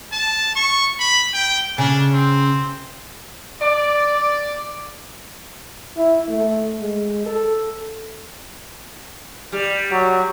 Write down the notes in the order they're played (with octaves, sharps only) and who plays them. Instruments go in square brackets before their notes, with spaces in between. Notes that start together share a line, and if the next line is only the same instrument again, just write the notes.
[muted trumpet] A5
C#6
B5
G5
[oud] C#3 [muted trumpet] D4
[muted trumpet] C4
[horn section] D5
[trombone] E4
A3
G#3
A4
[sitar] G3
[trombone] F#3